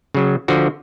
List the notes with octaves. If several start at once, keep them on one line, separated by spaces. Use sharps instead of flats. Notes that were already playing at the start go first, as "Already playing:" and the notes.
C#3 F#3
D3 F3 F#4